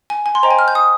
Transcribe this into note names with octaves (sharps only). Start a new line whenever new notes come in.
G#5
G#5
C6
C5 D#5 G5 A#5
G#5
F6
G6
D#6